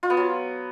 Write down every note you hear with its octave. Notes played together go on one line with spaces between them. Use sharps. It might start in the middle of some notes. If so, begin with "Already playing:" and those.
F4
B3
F#3